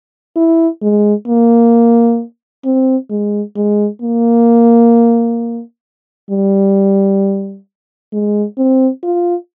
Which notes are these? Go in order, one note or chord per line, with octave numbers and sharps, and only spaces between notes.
E4
G#3
A#3
C4
G#3
G#3
A#3
G3
G#3
C4
F4